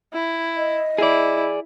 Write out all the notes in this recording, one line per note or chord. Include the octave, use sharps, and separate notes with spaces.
E4
D#5
E4 G#4 D5